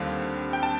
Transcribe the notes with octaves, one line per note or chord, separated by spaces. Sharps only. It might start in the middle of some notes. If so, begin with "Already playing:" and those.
Already playing: D#2 D3 G3 C4 F5
G5
A5